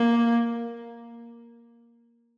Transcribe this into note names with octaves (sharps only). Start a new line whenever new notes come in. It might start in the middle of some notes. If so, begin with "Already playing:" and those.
Already playing: A#3